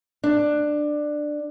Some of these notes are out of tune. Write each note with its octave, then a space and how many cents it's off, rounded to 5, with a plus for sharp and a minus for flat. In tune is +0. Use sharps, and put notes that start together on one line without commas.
D4 +15